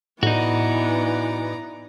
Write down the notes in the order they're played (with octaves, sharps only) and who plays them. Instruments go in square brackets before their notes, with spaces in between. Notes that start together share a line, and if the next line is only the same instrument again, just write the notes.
[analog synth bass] A2 [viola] E3 B3 [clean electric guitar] D#4 F#4 [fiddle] D5 A#5